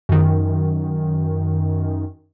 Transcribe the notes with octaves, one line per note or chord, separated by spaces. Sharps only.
F#2 D#3